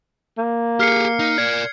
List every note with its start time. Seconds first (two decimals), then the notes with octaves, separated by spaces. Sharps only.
0.38 A#3
0.80 G4 G#4 F6 C7 C#7
1.19 D#4
1.38 A#4 D5 G#6